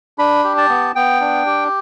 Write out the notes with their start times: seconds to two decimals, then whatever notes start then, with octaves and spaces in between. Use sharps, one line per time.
0.18 D4 B5
0.44 G4
0.58 A5
0.69 B3
0.95 B3 G5
1.21 D4
1.46 G4